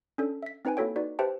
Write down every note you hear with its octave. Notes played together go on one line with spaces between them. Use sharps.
C#4 D4 A4
E5 B6
C4 D#4 B4 G5 G#5
A#3 E4 F#4 A4 C#5 G5
D#4 F#4 B4 D5
G4 B4 C5 E5 G5 A5